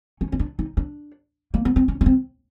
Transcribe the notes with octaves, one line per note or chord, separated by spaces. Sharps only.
C#4
C#4
D4
D#4
D4
A#3
B3
C4
C#4
C#4
C4